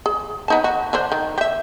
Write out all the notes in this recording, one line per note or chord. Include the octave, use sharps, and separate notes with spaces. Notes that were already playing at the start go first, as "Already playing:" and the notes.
G#4
B3 D#4 A5
F#4
D3 D4 C5
D#3
G4 E5